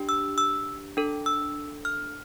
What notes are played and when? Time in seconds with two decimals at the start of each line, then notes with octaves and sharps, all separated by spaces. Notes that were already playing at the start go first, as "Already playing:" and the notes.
Already playing: D4 G4
0.09 E6
0.38 E6
0.97 D4 A4
1.26 E6
1.85 F6